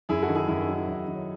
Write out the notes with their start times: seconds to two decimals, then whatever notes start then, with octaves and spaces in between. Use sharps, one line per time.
0.09 F#2 E4 G#4
0.22 F#4 A4
0.29 D#3
0.35 E4 G#4
0.48 F#2 E4
0.61 D#4
0.68 F#3
0.74 E4
0.87 F#2
1.07 D#3
1.14 C#5